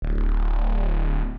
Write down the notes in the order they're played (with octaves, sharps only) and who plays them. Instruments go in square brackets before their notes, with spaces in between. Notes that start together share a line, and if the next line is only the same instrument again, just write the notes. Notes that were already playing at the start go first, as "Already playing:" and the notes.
[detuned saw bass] D1